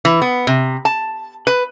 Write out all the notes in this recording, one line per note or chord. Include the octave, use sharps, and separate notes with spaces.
E3
B3
C3
A5
B4